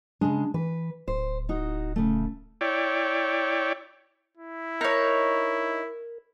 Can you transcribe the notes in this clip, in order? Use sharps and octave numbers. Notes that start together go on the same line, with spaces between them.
C#3 G#3 D4
E3 B4
D1 C5
D#4 F#4
C#3 A3
E4 C#5 D5 G5
E4
D#4 A#4 C#5